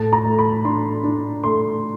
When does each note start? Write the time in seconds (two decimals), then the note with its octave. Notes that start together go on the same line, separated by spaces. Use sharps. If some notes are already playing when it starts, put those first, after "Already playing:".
Already playing: A2 A5
0.13 A#5
0.25 A3
0.39 B5
0.64 D4 C6
1.04 D4
1.43 A3 C6